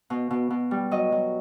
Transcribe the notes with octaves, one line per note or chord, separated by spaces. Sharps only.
B2
B2
B2
G3
F#3 D#5
F#3